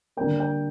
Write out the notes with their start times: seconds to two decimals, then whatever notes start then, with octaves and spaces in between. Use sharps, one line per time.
0.17 D3 G3 A#3 G5
0.40 G5